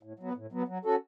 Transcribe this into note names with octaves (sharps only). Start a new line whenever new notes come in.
A2
F#3 B3
A2
F#3 B3
F#3
C#4 F#4 A4